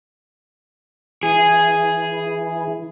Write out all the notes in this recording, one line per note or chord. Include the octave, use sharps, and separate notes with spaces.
E3 E4 G#4